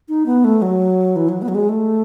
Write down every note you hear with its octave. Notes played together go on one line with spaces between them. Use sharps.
D#4
B3
A3
F#3
E3
F#3
B3
F#3
G#3
A3